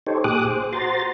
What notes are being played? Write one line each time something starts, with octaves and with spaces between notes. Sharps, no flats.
D#4 G4 A4 C5 C#5
A#2 G4 G#4 D6 D#6 F#6
C5
F#4 C5 A#5 C6 A6